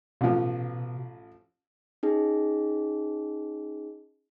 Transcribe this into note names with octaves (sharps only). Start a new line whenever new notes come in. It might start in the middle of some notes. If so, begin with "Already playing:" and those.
A1 B2 F3
C#4 D#4 G#4